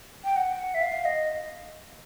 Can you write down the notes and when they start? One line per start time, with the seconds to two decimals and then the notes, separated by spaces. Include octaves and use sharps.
0.24 G5
0.36 F#5
0.74 E5
0.82 F5
1.05 D#5